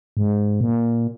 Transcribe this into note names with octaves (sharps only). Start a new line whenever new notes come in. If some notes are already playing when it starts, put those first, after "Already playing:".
G#2
A#2